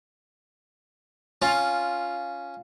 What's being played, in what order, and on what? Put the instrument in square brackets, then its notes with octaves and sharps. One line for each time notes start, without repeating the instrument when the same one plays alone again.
[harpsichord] C#4 [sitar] F4